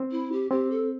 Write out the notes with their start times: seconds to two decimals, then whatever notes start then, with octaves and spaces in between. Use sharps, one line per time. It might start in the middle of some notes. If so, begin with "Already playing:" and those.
Already playing: C4
0.11 E4
0.32 G4
0.51 C4 G4
0.71 A4